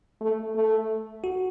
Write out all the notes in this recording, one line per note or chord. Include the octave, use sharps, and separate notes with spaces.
A3
A3
F#4